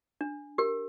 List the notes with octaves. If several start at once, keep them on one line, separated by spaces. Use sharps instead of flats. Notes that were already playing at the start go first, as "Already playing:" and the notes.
D4
G4 A#4